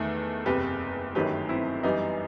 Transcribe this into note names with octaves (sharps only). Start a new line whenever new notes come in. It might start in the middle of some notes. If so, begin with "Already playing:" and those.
Already playing: E2 D#3 A3 A4
F#1 E2 C3 G4 B4
G1 F#2 D#3 F#3 A3 G4 B4
C4 E4
F#2 E3 G3 B3 D#4